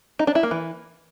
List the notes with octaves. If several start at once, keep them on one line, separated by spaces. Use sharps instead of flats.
D#4
D4
E4
A#3
E3